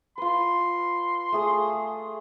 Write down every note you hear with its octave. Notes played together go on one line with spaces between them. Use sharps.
F4 B4 C6
A3 G#4 D#6